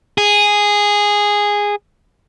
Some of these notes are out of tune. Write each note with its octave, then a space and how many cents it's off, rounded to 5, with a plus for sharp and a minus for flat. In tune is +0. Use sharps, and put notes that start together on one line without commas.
G#4 -10